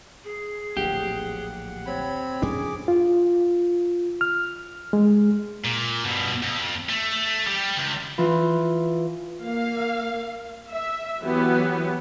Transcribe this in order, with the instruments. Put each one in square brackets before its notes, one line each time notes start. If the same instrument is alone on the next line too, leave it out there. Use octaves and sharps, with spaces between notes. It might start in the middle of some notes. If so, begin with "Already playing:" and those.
[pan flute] G#4
[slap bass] D1 A#1 [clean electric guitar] G4 [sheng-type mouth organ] F#5
[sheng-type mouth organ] C4 B5 [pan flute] C#5
[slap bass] F2 C#4 D4 [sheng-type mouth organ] G#4 D6
[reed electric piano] F4
F6
G#3
[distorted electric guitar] A#2
G2 B2
F2
A3
G3 G4
C#2
[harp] E3 F4
[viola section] A#3 F5
E5
E3 F#3 B3 F#4 G4 B4